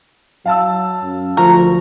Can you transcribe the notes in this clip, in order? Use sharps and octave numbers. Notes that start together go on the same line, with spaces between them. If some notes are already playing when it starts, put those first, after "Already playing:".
F#3 F5 A5 E6
F#2
D2 F3 F4 A#4 C#6